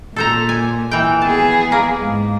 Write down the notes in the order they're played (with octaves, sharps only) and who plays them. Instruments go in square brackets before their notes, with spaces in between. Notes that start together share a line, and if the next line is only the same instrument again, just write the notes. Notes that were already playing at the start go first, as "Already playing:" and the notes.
[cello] A#2 [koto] A4 C5 A#5
[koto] G#5
E3 G5
[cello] B3 G#4 [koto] A5
[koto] A#3
[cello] G#2